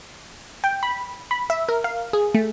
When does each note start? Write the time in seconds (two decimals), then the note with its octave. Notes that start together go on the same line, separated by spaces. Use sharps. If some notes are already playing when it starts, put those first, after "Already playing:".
0.64 G5
0.83 B5
1.31 B5
1.50 E5
1.69 A#4
1.84 F5
2.13 G#4
2.35 A3